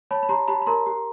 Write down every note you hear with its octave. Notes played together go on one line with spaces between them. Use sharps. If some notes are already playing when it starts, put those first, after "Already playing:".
C#5 A5 B5
B5
G4 A#5 C6
G4 A5 B5
B5
A#4 A#5 C6
G4